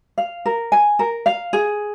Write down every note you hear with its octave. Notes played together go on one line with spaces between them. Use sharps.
F5
A#4
G#5
A#4
F5
G#4